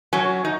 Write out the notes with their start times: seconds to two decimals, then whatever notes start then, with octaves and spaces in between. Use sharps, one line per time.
0.13 F#3 C#4
0.45 D#4